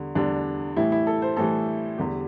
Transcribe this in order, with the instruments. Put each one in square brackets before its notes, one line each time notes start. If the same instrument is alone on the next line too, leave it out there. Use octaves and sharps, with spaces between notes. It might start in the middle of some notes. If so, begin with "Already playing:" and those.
Already playing: [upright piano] E2 D3 G3
E2 D3 G3 D4
A2 E3 G3 E4
E4
A4
C5
A2 E3 G3 A4
E2 D3 G3 G4